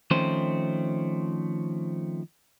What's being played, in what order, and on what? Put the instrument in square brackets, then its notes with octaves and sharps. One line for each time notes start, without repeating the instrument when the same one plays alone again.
[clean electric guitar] D#3 F3 A3 C4 C#4 C5